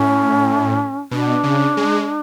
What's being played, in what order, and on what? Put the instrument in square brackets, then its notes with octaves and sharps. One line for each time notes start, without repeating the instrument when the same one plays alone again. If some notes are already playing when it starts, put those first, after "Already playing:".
Already playing: [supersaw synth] A2 [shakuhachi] C#4
[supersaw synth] B2 [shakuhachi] D4
[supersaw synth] C#3
G#3